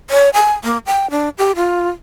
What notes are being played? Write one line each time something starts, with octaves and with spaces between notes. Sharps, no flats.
C#5
G#5
A#3
G5
D4
G4
F4